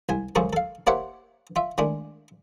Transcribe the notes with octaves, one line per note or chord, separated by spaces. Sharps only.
C2 G#5
C#2 F#2 F3 G#4 A4 C#6
A4 F5
A#3 G4 C5 C#5 E5 F#5
F4 E5
D#3 G#3 A3 D4